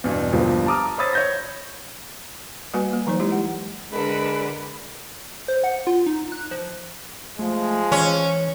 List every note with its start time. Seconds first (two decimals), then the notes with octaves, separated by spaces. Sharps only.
0.04 E2 G2 B2
0.32 G1 F3 G3 A#3 D4
0.66 A5 A#5 D6 D#6 F6
0.98 C5 C#5 B5 D#6 E6 A6
1.13 C#5 G6 A#6
2.74 G3 A#3 F#4 B4 G#5
2.93 A#3
3.07 E3 F#3 D#4 C5
3.20 G#3 E4 G4
3.32 F#5
3.92 D3 G#3 D4 A#4 B4 F#5
5.48 C5
5.64 F#5
5.87 F4
6.06 D#4
6.32 F#6
6.51 F3
7.39 F3 G#3 A3
7.92 E3 C#4